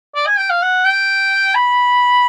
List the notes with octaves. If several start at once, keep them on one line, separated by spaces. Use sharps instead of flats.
D5
G#5
G5
F5
F#5
G5
B5